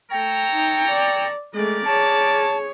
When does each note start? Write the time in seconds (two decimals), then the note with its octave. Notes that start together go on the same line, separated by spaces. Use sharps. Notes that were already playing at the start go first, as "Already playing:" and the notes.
0.11 A3 A4 C#5 G5 A#5
0.52 D#4
0.89 D5
1.54 G#3 A3 G4 A#4 D5
1.85 G#4 C#5 A5